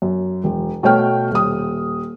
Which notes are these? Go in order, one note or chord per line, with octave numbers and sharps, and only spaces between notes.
F#2
E1
B2 A3 C#5 G5 F6
D#1 D#6